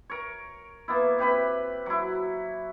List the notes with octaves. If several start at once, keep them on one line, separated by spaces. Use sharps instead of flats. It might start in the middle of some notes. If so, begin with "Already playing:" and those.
A#4 C#5
A#3 B3 E4
C3 G4 B4 B5
F#3 E4